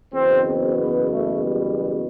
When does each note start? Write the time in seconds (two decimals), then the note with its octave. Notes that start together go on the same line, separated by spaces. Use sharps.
0.13 F#1 E2 B2 C4
0.45 C4
0.77 B3
1.09 A3
1.40 G3